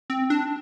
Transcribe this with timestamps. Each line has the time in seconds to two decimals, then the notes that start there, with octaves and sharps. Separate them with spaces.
0.10 C4
0.30 D4